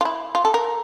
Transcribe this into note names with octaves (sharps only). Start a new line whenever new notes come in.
F4
E4
F4
A4
A#4